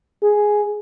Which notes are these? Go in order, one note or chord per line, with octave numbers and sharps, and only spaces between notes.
G#4